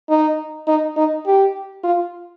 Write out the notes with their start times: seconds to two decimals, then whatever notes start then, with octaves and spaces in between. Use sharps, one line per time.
0.10 D#4
0.68 D#4
0.97 D#4
1.26 G4
1.84 F4